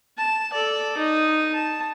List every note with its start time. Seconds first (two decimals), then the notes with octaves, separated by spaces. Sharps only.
0.17 A5
0.53 A4 D5
0.98 D#4
1.54 A5